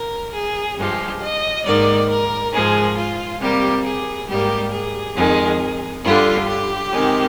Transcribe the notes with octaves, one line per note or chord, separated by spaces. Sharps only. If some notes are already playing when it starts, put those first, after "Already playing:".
Already playing: A#4
G#4
G2 F3 G#3 G4
D#5
G#2 D#3 A#3 D5
A#4
G#2 F3 G#3 G#4
F4
C3 G3 A#3 G4
G#4
G#2 G3 A#3 G4
G#4
F2 D#3 G#3
G2 D3 G3 F4
G4
C3 D#3 G#3